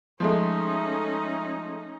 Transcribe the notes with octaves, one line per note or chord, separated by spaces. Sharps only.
F3 G#3 A3 C#4 D#4